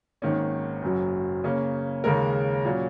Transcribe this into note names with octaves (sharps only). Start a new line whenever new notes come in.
G#1 G#2 D#3 A#3 C#4
F#1 F#2 F#3
C#3 A#3 C#4
D#2 C#3 G#3 C#4 A#4
A#2 F#3 C#4